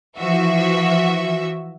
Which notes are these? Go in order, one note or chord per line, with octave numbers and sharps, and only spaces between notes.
E3 F3 F#4 E5